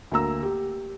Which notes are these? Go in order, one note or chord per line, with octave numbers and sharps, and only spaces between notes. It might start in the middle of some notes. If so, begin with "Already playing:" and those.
D2 A#3 A#5 E6
G4